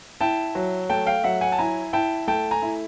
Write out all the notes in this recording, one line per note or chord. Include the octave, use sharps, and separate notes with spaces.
E4 G5 A5
F#3
A3 G5 A5
F5 G5
F#3 E5 F#5
F#5 G#5
A5
E4 G#5 A#5
E4 G5 A5
A3 G5 A5
G#5 A#5
E4